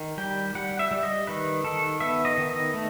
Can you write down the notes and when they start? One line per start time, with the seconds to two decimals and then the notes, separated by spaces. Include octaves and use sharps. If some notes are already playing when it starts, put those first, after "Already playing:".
Already playing: D#3
0.18 G3 G5
0.55 G3 F#5
0.79 E5
0.91 G3
1.03 D#5
1.27 D#3 B4
1.64 D#3 A4
2.00 B3 E5
2.25 D#5
2.37 D#3
2.50 D#5
2.74 A3